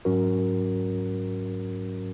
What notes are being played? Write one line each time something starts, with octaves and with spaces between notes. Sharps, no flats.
G#2 F#3 C#4 F#4 A#4